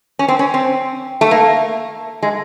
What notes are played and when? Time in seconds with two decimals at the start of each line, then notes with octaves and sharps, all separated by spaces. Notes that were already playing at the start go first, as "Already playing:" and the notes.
0.19 C#4
0.28 C4
0.39 C#4
0.54 C4
1.21 A3
1.31 A#3
2.23 G#3